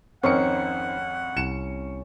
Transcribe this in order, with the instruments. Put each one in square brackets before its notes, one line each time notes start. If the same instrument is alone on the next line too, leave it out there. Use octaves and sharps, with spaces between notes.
[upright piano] G#1 F2 C#7 [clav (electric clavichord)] C4 D#4 A#4 [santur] C#4 [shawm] F#5
[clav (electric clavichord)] C2 [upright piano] C#7 E7